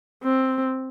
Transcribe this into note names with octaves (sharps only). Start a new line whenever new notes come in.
C4